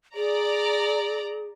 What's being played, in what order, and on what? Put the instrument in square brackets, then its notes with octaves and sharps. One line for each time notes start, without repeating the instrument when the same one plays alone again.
[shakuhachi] G#4 [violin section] D5 A#5